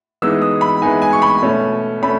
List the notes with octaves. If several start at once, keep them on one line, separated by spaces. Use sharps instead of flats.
E3 G#3 B3 D#4 E6
D#6
B5
E3 G#3 B3 D#4 G#5
G#5
C#6
B5
B2 A3 C#4
A3 C#4 B5